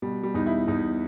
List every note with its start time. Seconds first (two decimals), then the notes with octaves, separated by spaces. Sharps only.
0.02 B2 G3
0.23 G3
0.34 E2 D#4
0.46 E4
0.68 E2 D#4